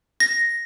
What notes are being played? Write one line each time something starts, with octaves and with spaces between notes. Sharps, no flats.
A#6